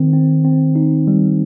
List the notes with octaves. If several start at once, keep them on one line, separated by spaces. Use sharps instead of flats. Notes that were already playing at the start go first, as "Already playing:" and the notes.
Already playing: D#3 C4
C4
C4
D#4
G3